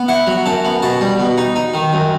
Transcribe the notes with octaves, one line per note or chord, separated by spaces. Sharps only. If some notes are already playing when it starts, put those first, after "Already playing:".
Already playing: B3
E4 F#5
F#3
F#2 A5
B3
B2 A5
G3
B2
D#4
D#4
D#3
F#2